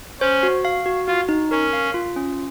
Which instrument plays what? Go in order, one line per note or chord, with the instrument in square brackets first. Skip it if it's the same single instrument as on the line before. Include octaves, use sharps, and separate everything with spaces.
[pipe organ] C#4 [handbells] C5
[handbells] F#4
F5
F#4
[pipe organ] F4 [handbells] F#4
[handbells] D#4
[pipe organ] C#4 [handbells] A#4
[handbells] F5
F4
C#4